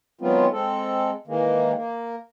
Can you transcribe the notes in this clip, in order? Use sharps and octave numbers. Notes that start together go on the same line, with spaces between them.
D#3 F#3 G#3 B3 C4 F4
G#3 C4 A4
D#3 E3 G#3 A#3
A#3